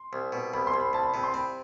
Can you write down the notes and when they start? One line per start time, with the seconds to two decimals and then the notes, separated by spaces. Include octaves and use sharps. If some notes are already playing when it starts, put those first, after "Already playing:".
Already playing: C6
0.13 C2
0.32 B2
0.53 C2 B5
0.67 C6
0.74 C2
0.80 B5
0.93 C2 A5
1.03 B5
1.13 C3 B5
1.24 C6
1.33 C4 B5